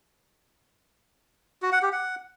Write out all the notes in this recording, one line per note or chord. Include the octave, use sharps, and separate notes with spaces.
F#4
F#5
G4
F#5